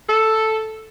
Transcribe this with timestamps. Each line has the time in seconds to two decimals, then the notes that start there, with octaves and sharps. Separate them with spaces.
0.08 A4